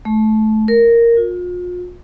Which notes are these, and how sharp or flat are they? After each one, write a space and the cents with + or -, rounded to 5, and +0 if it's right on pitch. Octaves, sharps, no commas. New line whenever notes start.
A3 -20
A#4 -5
F4 +40